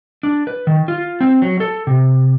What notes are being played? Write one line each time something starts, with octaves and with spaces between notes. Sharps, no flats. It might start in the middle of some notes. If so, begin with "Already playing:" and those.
D4
B4
D#3
F4
C4
F#3
A4
C3